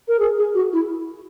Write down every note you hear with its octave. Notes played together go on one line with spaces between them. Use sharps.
A#4
G#4
G#4
F#4
E4